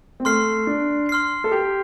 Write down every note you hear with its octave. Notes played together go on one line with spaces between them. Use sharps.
C4
A3 C6 F6 C7
D4
C6 F6 C7
A4
G4